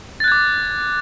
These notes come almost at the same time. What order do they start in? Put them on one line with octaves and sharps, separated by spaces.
A6 F#6 G#6 D6